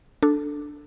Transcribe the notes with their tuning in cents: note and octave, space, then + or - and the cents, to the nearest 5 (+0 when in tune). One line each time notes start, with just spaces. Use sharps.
D4 +0 A4 +0